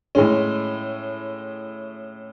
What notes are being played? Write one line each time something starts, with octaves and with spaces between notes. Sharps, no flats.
A2 G#3 C#4